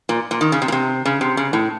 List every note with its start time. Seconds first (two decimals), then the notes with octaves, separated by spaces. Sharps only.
0.09 A#2
0.31 A#2
0.41 D#3
0.52 C#3
0.62 C3
0.68 A#2
0.72 C3
1.05 C#3
1.21 C3
1.37 C#3
1.53 A2